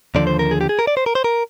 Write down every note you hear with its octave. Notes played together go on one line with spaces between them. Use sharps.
D#2 D3 F3 D5
C5
A#4
G#4
G4
G#4
A#4
D5
C5
A#4
C5
A#4